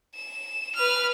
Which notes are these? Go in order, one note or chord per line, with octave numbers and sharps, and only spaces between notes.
E7
B4 F6